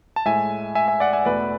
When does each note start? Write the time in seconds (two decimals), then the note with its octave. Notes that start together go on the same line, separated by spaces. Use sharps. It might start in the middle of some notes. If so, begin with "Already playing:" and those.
0.16 A5
0.26 A2 G#3 E5 G#5
0.75 E5 G#5
0.88 E5 G#5
1.00 D5 F#5
1.13 E5 G#5
1.25 E2 B2 A3 B4 D5